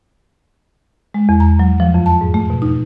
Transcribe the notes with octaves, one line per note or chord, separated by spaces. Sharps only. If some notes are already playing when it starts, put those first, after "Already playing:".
G#3
E2
A#5
F#3
F3
F2
A5
G#2
A3
B2
D#4